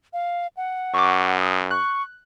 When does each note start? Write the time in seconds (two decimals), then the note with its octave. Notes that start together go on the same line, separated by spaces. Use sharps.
0.13 F5
0.57 F#5
0.94 F#2 C#6 D6
1.40 D#6
1.71 C#6 F#6